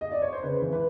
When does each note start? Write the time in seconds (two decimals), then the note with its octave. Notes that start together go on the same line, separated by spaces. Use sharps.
0.01 D#5
0.12 D5
0.22 C#5
0.33 C5
0.43 C#3 B4
0.62 E3
0.73 B4